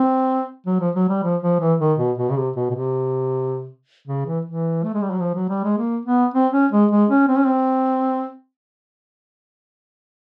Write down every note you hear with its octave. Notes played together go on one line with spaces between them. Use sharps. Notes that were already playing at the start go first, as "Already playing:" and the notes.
Already playing: C4
F#3
F3
F#3
G3
F3
F3
E3
D#3
B2
B2
C#3
C3
B2
B2
C3
C#3
E3
E3
A3
G#3
G3
F#3
F3
F#3
G3
G#3
A#3
B3
C4
C#4
G#3
G#3
C#4
C4
C#4
C4